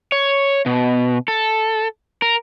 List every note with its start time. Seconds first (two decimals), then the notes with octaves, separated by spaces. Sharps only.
0.12 C#5
0.66 B2
1.28 A4
2.22 A#4